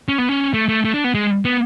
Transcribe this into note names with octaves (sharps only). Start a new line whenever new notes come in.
C#4
B3
C#4
A3
A3
A3
D4
B3
G#3
B3